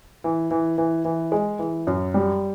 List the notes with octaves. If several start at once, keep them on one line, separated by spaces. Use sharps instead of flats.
E3
E3
E3
E3
G#3
E3
F#2
G3